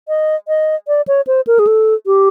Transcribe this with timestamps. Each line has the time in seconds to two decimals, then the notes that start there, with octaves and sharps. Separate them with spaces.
0.08 D#5
0.48 D#5
0.88 D5
1.08 C#5
1.27 C5
1.47 A#4
1.59 G#4
1.67 A4
2.06 G4